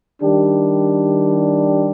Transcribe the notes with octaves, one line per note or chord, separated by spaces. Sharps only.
D#3 G3 D4 G4